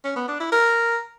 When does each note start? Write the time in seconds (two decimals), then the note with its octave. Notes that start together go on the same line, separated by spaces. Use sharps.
0.04 C#4
0.16 B3
0.28 D4
0.40 E4
0.52 A#4